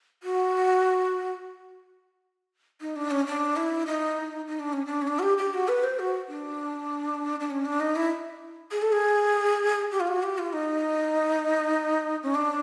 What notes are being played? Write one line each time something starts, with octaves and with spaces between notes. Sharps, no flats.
F#4
D#4
D4
C#4
D4
E4
D#4
D#4
D4
C#4
D4
C#4
D4
F#4
G4
G4
F#4
B4
C5
F#4
D4
D4
C#4
D4
D#4
E4
G#4
A4
G#4
G4
F4
F#4
G4
F4
D#4
C#4
D4